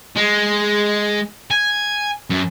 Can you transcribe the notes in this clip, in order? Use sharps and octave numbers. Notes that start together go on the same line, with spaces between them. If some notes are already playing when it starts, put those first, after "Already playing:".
G#3
G#5
F#2